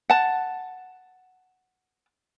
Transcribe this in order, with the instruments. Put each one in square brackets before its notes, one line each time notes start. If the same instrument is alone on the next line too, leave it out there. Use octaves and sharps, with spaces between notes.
[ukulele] F#5 A5